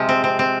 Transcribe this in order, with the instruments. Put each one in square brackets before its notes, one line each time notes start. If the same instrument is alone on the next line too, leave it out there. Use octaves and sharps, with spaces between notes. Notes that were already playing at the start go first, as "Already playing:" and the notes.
Already playing: [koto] C3 F3 G#3
C4
C4
C4